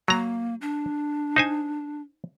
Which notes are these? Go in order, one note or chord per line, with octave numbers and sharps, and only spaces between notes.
F#3 A#3 A#5
D4
D#4 C5 G#5